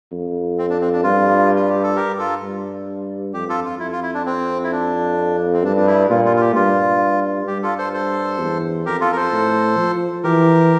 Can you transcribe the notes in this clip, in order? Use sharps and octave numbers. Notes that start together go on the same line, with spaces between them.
F2
C4
D4
C4
D4
G2 F4
F4
G4
A4
G4 A#4
F4 A4
G2
F2 G4
F4 A4
F4
F2 E4
F4
E4
D4
C4
E4
D4
C4
G2 D4
D4
E4
A#2 F4
F4
F4
G4
G2 F4
G2 G4
F4 A4
A4 C5
A4 C5
E2
F2 G4 A#4
F4 A4
A#4
A4 C5
A2
F3
E3 G4 A#4